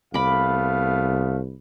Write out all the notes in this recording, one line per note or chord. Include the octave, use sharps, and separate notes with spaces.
C2 A3 B3 F5 B5 D6